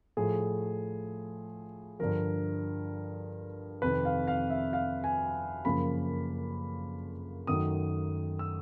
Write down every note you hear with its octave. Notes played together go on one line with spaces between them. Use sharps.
A2 F3 A3 G#4
G2 D3 F3 A#4
F2 C3 D#3 B4
F5
F5
E5
F5
G#5
F#2 C#3 F3 A#3 B5
F#2 D#3 F#3 A3 D#6
E6